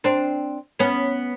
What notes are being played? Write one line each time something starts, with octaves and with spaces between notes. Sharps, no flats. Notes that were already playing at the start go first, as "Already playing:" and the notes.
C4 D4
B3 C#4